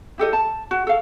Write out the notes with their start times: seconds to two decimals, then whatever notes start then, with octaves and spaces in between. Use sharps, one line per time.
0.18 E4 G4 A4 D#5
0.33 A5
0.71 F#4
0.87 A4 F5